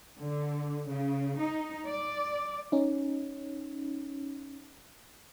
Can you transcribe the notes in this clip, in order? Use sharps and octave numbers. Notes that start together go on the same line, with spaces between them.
D3
C#3
D#4
D5
C#4 D#4